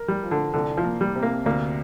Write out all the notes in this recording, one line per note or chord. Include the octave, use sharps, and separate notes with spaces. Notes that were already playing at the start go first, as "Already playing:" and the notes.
Already playing: A#4
G3
F3
D3
C2 D3
F3
A#3
G3
C3
A#3
D2 A#3